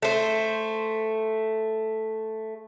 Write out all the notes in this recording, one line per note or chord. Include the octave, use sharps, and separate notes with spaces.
A3 C5